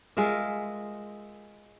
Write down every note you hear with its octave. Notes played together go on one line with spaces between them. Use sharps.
G#3 F4 A#4 E5